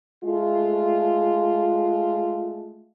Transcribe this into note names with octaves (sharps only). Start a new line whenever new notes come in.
G#3 A3 F4